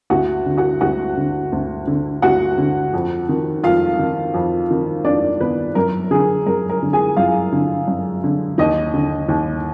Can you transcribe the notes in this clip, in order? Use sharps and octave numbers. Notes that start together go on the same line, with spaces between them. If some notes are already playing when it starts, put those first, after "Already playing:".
D2 F#4 F#5
D3
F#4 F#5
D2 F#4 F#5
D3
D2
D3
D2 F#4 F#5
D3
F2
D#3
F2 F4 F5
D#3
F2
D#3
F2 D4 D5
D#3 B3 B4
F#2 A#4
D3 G#4
F#2 A#4
A#4
D3
G#4 G#5
F#2 F4 F5
D3
F#2
D3
D#2 D#4 D#5
D3
D#2